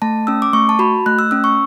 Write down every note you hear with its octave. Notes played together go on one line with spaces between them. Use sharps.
A3 A5
C#4 E6
D6
A3 C#6
A5
F#4 B5
A3 F#6
E6
C#4 E6
C#6